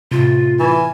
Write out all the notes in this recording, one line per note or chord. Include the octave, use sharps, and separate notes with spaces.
A2 C3 F4
E3 G#5